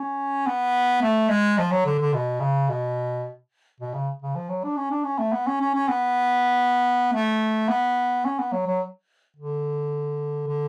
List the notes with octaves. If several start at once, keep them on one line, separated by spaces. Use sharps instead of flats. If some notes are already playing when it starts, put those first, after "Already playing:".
Already playing: C#4
B3
A3
G#3
F3
F#3
D3
D3
B2
C#3
B2
B2
C#3
C#3
F3
F#3
D4
C#4
D4
C#4
A3
B3
C#4
C#4
C#4
B3
A3
B3
C#4
B3
F#3
F#3
D3
D3